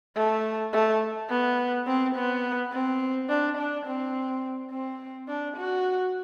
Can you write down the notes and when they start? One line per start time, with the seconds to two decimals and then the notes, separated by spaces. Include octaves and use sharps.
0.16 A3
0.73 A3
1.30 B3
1.87 C4
2.15 B3
2.72 C4
3.29 D4
3.57 D4
3.85 C4
4.71 C4
5.28 D4
5.57 F#4